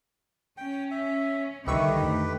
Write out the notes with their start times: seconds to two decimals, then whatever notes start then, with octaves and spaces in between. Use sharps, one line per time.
0.57 C#4 G5
0.91 E5
1.67 C2 D3 D#3 G3 G4 B4 E5 C#6
2.02 F2 A3